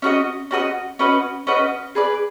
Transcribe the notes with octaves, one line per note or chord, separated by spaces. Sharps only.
C#4 F#4 B4 D#5
C#4 F#4 B4 D#5
C#4 F#4 B4 D#5
C#4 F#4 B4 D#5
G#4 B4 D5